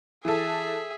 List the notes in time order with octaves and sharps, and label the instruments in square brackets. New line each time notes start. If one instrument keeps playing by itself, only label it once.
[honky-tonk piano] E3 A4 [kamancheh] G#4 E5